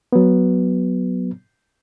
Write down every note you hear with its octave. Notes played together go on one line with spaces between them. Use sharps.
F#3 B3